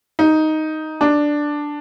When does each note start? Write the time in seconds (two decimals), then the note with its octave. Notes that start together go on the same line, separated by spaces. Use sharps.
0.19 D#4
1.01 D4